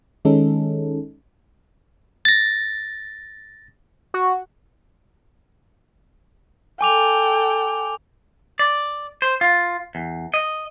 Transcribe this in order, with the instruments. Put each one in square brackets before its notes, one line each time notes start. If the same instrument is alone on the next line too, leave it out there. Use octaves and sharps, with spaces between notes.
[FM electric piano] D#3 G#3 C#4 D#4 A4
[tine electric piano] A6 A#6
[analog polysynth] F#4
[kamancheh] A4 G5 [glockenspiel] G#5 D6 F7
[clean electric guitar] D5
C5
F4
E2
D#5